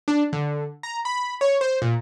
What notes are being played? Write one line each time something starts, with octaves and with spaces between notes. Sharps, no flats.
D4
D3
A#5
B5
C#5
C5
A#2